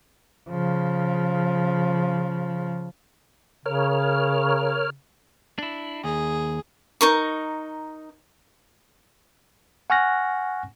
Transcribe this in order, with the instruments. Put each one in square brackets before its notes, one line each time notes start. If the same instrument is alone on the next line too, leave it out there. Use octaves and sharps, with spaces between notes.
[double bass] C#3 F3
[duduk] C#3 [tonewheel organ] A#4 C#5 F6
[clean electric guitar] D4 E4
[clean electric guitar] D#2 [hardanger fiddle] G#4
[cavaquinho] D#4 A#4 C#6
[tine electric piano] F#5 G#5 C#6 F6 F#6 A#6